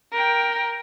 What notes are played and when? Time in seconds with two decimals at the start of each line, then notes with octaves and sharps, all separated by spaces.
0.13 A#4 G5